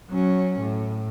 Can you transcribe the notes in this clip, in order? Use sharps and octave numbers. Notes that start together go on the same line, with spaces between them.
F#3 C#4
A2